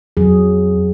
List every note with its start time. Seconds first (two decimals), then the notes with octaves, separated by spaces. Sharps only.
0.17 F2 F#3 G#4